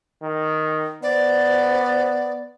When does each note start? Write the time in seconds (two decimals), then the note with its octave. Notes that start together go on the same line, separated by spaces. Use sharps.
0.22 D#3
1.03 B3 C5 D5